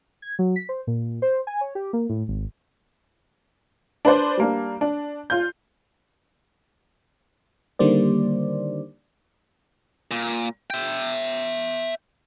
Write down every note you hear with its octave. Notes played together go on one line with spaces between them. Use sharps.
G#6
F#3
B6
C5
A#2
C5
G#5
C#5
G4
A#3
A2
G#1
D4 B4 C5 D5
G3 A#3 D4
D4
F4 G6
D3 D#3 G3 A#3 C5 D5
A#2
E5 G5